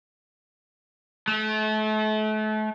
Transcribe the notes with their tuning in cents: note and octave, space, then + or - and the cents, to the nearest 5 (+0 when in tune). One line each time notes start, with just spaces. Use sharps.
A3 -35